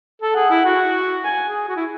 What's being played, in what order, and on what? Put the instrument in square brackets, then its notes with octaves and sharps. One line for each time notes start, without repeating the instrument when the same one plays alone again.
[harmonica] A4
[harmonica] G#4 [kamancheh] F#5
[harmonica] E4
F#4
[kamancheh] G#5
[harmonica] G#4
F#4
E4